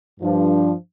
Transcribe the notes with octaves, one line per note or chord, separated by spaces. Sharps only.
G2 F3 D4